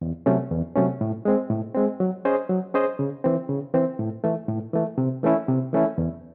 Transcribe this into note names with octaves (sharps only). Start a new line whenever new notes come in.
E2
C3 F#3 A3 C#4
E2
C3 F#3 A3 C#4
A2
G#3 C4
A2
G#3 C4
F#3
C#4 G#4 C5 D#5
F#3
C#4 G#4 C5 D#5
C#3
E3 C4
C#3
E3 C4
A2
E3 A3
A2
E3 A3
C3
E3 A3 C#4 E4
C3
E3 A3 C#4 E4
E2